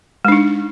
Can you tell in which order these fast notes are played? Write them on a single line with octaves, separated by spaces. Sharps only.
G#3 D4 D#4